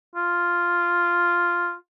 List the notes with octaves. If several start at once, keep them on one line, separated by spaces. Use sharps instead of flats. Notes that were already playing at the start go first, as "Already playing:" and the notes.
F4